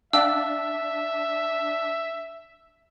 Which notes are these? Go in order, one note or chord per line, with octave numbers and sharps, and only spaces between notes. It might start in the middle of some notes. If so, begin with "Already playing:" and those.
C#4 D4 E5 F5 E6